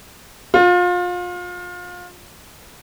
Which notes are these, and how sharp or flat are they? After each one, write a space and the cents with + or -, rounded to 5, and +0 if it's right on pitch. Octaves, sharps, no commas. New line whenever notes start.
F4 +30